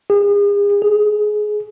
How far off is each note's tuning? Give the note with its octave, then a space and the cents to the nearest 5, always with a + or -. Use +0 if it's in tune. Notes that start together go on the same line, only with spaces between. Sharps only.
G#4 -40
G#4 +20